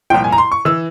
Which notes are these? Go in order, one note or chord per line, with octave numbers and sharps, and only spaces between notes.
C2 A#2 F3 G5
G#5
A#5
C6
C#6
E3 E6